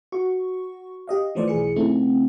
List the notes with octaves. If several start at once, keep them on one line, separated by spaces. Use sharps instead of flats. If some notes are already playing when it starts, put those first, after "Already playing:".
F#4 C#6
G4 D#5 F5
E3 F3 A3 B4 C5 D5
B1 E3 G#4 C#7
C#3 A3 C4 D#4 E4